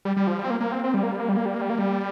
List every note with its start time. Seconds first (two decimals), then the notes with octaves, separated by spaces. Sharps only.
0.05 G3
0.17 G3
0.27 F3
0.39 G3
0.44 C4
0.50 A#3
0.61 A#3
0.72 C4
0.84 C4
0.94 G3
1.03 A#3
1.11 G3
1.20 A#3
1.29 G3
1.37 A#3
1.46 G3
1.54 A#3
1.61 G3
1.70 A#3
1.79 G3